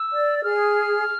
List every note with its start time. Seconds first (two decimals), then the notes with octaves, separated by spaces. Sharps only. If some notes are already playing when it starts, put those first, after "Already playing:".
Already playing: E6
0.14 D5
0.43 G#4 F6